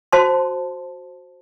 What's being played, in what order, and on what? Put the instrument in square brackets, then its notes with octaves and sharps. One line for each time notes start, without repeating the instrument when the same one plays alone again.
[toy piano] F#4 C5 A5 C6